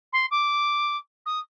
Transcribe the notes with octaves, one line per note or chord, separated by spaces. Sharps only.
C6
D6
D#6